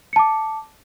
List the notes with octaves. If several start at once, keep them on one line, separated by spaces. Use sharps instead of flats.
A5 D6 C#7